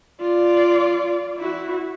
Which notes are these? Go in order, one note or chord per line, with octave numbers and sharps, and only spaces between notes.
F4 D5
E4 F#4